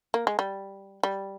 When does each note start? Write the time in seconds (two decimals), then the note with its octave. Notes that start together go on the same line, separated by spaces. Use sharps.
0.14 A#3
0.27 G#3
0.39 G3
1.03 G3